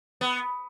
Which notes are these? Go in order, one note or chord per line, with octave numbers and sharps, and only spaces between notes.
B3